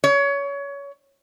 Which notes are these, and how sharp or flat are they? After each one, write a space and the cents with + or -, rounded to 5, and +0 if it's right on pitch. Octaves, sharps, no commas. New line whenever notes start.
C#5 +25